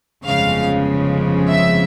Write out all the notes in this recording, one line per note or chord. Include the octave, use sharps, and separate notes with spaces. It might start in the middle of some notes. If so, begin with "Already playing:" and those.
G1 F2 C#3 F3 G#3 F5
E5